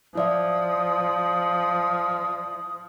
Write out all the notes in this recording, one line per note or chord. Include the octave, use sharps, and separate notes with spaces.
F3 E4 D5 E5 D#6